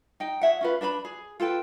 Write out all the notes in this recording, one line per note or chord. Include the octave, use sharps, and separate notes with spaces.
D#4 G5
G#4 C#5 E5 F#5
C#4 F4 B4
D4 B4 D#5 B5
G#4
F4 A4 B4 G5